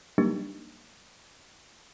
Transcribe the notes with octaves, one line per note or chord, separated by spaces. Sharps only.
F#3 G3 A#3 D4 D#4 G4